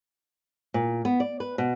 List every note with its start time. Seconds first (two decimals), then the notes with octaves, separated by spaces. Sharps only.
0.74 A#2
1.05 B3
1.20 D5
1.40 B4
1.58 B2